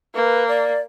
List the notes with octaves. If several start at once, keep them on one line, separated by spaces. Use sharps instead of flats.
A#3 B4
D5